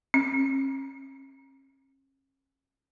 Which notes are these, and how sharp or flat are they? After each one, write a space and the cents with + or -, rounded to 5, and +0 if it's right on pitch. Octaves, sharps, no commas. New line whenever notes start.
C#4 -40